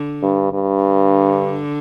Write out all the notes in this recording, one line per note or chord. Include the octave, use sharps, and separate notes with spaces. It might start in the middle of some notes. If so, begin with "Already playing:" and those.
Already playing: D3
G2
G2
D3